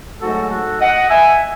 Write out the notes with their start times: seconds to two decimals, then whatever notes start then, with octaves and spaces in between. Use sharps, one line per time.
0.21 G#2 F#3 A3 D#4 F#4 A4
0.50 F#4 A4
0.81 D#5 F#5
1.09 E5 G#5